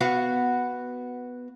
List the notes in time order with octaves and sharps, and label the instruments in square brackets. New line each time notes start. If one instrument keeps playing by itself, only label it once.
[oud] B3 F#4 F5